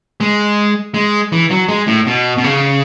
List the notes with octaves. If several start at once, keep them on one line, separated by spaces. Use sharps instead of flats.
G#3
G#3
E3
F#3
G#3
A2
B2
B2
C#3